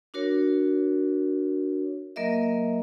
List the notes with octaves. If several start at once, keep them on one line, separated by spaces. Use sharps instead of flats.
D4 F#4 A#4 C#5
F#3 A#3 A#4 D#5 E5